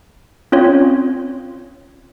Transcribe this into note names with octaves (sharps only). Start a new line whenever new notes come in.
C4 C#4 F4 C#5